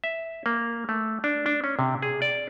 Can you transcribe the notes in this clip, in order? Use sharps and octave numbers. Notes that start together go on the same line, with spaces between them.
E5
A#3
A3
D4
D4
C#4
C3
G#4
D5